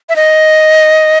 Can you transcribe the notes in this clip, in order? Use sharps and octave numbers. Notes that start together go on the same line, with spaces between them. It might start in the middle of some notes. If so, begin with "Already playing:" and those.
E5
D#5